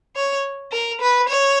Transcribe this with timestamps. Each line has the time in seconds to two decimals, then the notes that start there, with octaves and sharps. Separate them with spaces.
0.16 C#5
0.72 A#4
1.01 B4
1.29 C#5